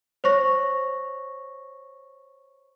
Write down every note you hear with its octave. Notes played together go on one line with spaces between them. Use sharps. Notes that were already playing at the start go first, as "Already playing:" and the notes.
C5 C#5 C#6 A#6